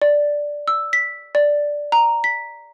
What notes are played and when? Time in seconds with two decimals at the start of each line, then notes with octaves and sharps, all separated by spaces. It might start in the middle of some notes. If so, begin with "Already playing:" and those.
0.02 D5
0.68 E6
0.93 B6
1.35 D5
1.92 A#5
2.24 B6